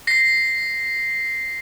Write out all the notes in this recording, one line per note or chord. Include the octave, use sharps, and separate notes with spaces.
A#6 C7